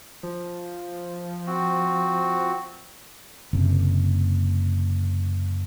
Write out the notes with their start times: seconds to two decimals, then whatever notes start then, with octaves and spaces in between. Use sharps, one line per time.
0.23 F3
1.47 C4 F#4
3.53 F#1 C3